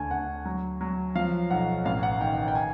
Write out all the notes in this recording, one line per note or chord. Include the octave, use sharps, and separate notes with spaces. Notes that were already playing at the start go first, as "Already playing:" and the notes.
Already playing: D2 G#5 A5
D2 F#5
F#3
F#3
F3 F5
B1 F#5
A1 F5
F#5
D#3 G5
G5
G5
G#5